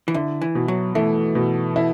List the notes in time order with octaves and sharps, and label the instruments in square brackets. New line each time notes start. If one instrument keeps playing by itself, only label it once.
[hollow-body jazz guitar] E3
[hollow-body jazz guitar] D3 [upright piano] E4
[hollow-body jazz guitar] E3
[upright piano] B2
[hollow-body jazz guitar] F#3
[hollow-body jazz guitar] E3 [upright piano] A3
[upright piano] B2
E4